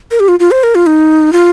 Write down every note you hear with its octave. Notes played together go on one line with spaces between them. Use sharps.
A#4
G4
F4
F4
C5
A#4
F4
D#4
F4